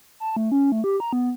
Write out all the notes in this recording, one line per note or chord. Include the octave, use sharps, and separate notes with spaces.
A5
A3
C#4
A3
G4
A#5
B3